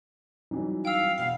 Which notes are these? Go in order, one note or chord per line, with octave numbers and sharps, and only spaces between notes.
F2 E3 F#3 G3 C#4 D#4
F5 G5 E6
E1 F5 F#5 C7